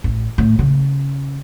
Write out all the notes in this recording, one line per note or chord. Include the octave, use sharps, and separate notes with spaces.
A1
A2
C#3